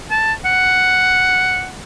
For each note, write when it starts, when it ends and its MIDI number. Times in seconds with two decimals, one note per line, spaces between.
0.11 0.33 81
0.45 1.71 78